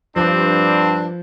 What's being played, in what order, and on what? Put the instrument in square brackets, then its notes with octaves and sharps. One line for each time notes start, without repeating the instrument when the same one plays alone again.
[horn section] G2 D4 [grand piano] F3 [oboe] C4